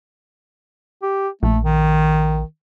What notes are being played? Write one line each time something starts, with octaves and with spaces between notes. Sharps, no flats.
G4
A#1 A3
D#3